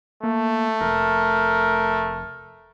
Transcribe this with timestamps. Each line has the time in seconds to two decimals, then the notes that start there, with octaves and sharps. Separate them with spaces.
0.24 A3 A#3
0.81 F1 A#4